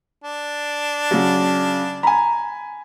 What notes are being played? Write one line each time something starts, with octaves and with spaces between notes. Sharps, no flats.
D4
C#3 F#3
G#5 A#5 B5